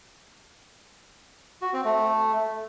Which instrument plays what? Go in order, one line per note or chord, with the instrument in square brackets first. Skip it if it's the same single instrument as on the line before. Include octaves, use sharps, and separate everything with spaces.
[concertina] F#4
C4
A3